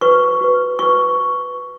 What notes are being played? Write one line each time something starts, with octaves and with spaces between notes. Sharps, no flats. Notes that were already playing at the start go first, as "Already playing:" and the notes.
F#4 B4 C#6
F#4 B4
F#4 B4 C#6